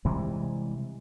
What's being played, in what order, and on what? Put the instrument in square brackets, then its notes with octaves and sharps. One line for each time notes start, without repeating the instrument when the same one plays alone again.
[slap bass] C3 E3 G3 G#3